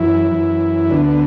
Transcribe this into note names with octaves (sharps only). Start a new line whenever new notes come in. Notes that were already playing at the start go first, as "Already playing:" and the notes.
Already playing: F#2 E3 E4
F#2 E3
D2 D3 B3
B3